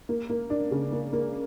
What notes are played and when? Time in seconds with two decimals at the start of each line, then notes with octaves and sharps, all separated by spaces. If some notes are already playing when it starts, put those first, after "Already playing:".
0.09 A#3
0.30 A#3
0.50 D4
0.71 C#3
0.92 A#3
1.13 A#3